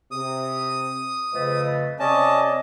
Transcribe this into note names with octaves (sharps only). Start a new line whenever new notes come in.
C3 D#6
F2 C#3 A3 B4 D#5
C3 C#4 D5 D#5 A5